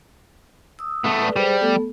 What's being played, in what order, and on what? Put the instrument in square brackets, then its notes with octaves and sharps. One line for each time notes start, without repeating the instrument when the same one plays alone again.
[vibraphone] D#6 E6
[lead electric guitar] A3 B3
[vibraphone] A4 B4 D5
[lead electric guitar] G3 [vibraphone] G#4 C5
[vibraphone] A3 B3 A4